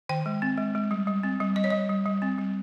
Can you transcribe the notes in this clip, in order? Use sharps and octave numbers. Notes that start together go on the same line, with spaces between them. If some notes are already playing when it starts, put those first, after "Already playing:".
D#3 G5
G#3
C4
G#3
G#3
G3
G3
C4
G3
G3 D#5
C#5
G3 D#5
G3
G3
C4
G3